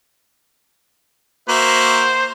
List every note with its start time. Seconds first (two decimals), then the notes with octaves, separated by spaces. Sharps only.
1.49 A#3 F#4 C5 E5